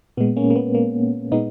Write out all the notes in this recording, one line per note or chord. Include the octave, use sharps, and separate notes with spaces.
A#2 G#3 B3
A#3 C#4
A#3
B3
A#3
A#2 G#3 B3 D#4